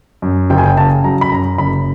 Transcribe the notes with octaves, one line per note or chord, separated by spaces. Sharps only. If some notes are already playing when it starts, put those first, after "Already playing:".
F#2
F#1 G5
G#5
G5
C#3 A5
F#3 A#5
B5
F#2 A#5
F#1 B5